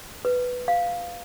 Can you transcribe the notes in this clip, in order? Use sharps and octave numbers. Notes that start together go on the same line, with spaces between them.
B4
F5